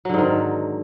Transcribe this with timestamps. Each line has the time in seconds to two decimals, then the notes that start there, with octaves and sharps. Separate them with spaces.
0.05 F#3
0.09 D3
0.14 G#2
0.18 D#3